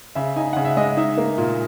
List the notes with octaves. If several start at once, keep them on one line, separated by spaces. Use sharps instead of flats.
C#3 E5
D#4 G#5
C#3 F#5
E5
G#3 D#5
D#4 E5
A#3
A#2